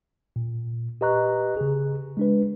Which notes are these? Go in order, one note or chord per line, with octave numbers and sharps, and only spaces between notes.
A#2
G4 B4 D#5 A#5 C#6 F#6
C#3 G#4
G#3 D4 B4